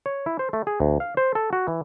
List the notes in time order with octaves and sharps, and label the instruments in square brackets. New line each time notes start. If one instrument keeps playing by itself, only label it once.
[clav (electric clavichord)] C#5
E4
C5
A3
G#4
D2
F5
C5
A4
F#4
E3